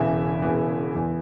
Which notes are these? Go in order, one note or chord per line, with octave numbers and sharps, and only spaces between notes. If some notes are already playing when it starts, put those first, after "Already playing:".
Already playing: E1 E2 C#3 E3 E5
E1 E2 C#3 E3
E2 E3